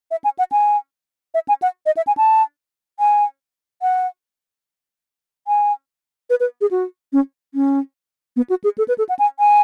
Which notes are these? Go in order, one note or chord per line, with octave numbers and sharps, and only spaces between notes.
E5
G#5
F#5
G#5
E5
G#5
F#5
D#5
E5
G#5
A5
G#5
F#5
G#5
B4
B4
G#4
F#4
C#4
C#4
B3
F#4
G#4
A4
B4
A4
F#5
G#5
G#5